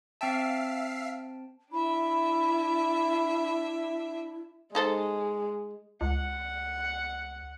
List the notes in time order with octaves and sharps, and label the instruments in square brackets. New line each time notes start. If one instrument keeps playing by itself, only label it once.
[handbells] C4 G5 A5 [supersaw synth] E5 F5 C7
[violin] D4 E5 [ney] E4 [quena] B5
[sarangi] G#3 [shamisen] D#4 A4 C5
[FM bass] C#2 [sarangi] F#5